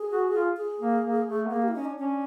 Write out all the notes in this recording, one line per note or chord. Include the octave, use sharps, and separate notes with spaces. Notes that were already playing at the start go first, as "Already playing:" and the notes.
Already playing: G#4
F#4
F4
G#4
A#3
A#3
A3
B3
A#3 G#4
G4
E4
C#4 D#4
D4
C#4 D4